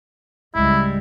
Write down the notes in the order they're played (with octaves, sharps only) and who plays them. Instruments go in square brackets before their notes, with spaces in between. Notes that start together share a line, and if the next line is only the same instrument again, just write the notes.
[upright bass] C#2 G#2 [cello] G3 G#3 [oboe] E4